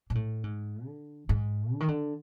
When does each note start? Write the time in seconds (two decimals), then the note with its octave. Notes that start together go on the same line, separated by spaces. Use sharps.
0.10 A#2
0.15 A2
0.44 G#2
0.86 D3
1.29 G#2
1.73 D3
1.80 D#3
1.88 D3